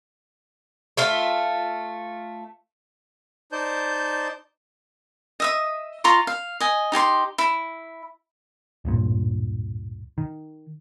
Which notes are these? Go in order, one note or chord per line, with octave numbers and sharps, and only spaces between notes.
A3 F4 E5
D#4 C5 D5 A5 G6
D#5 E5 D#6
F4 A#5 C6 C#6
F5
D#5 G#5
D#4 G4 G#5 C6
E4
D1 G2 A#2
D#3